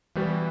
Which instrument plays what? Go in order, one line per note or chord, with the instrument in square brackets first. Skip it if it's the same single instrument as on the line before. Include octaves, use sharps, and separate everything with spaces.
[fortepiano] B2 G3 B3 [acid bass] E3